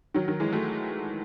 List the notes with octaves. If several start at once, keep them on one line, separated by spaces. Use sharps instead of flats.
D#3 F#3
D#3 F#3
E3 G#3
F#3 A3